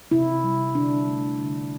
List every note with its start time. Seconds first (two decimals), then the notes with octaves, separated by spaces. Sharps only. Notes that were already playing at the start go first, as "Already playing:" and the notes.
0.11 C3 E4
0.44 G3
0.75 D3 D4
1.08 A3
1.39 D3